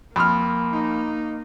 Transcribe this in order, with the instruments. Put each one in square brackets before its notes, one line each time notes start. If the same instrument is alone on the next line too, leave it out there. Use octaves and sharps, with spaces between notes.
[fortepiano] F2 F6 [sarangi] A#3 [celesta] B5 C6 D#6
[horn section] D#4